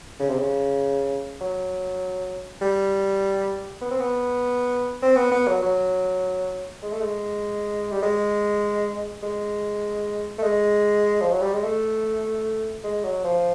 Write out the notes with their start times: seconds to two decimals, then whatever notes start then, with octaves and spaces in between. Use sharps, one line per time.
0.20 C#3
0.30 C3
0.38 C#3
1.41 F#3
2.62 G3
3.82 B3
3.91 C4
4.00 B3
5.02 C4
5.17 B3
5.32 B3
5.48 F#3
5.62 F#3
6.83 G#3
6.92 A3
7.02 G#3
7.92 G3
8.03 G#3
9.23 G#3
10.38 A3
10.43 G#3
11.21 F3
11.32 F#3
11.42 G3
11.53 G#3
11.64 A3
12.84 G#3
13.04 F#3
13.24 F3